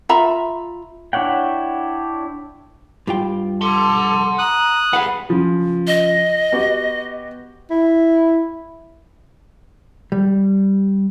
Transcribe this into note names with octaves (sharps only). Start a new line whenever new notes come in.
F4 E5 A#5 B5
D4 E4 C#5 F#5 G5
G2 F4 G5
A4 F#5 A5 C6 D6
A#5 D#6 F#6
G3 G#4 B4 F5 F#5 B5
C#3 F3
D#5
B3 F#4 G4
E4
G3